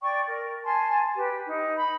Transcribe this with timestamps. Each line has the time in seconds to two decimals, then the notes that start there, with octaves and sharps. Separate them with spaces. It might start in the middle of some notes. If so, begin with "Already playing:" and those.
0.01 D5 G5 C#6
0.27 A#4
0.65 G#5 A5 C6
1.15 G4 B4
1.46 D#4
1.77 B5